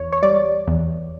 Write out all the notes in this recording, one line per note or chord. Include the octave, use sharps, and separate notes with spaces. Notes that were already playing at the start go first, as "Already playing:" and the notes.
Already playing: E2 C#5
C#5
G3 D5
E2